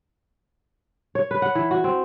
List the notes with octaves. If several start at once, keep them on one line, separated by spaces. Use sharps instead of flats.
C#5
B4
F#5
E3
F#4
C4